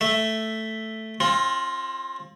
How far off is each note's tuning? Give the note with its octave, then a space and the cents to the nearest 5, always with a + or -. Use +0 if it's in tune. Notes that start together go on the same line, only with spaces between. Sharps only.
A3 +0 E5 +0
C4 +40 F4 +5